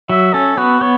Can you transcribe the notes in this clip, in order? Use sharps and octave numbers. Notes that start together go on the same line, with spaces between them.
F#3 E5
C#4 A4
B3 F#4
B3 C#5